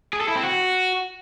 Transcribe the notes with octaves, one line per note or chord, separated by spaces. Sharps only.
G#4
A4
E4
C4
F#4